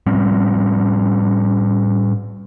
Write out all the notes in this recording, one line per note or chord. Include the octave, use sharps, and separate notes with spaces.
A2 G3 C4 C#4